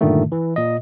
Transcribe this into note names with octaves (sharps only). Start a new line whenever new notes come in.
G2 A#2 D3 D#3 A3
E3
A#2 D#5